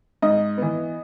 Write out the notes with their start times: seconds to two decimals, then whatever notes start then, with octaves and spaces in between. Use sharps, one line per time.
0.22 G#2 D#5
0.57 E3 B3